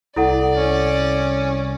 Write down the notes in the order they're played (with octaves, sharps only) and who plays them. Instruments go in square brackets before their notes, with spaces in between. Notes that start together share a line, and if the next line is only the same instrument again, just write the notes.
[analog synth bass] C2 [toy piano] E4 A4 F#5 [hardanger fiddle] D5
[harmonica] C#4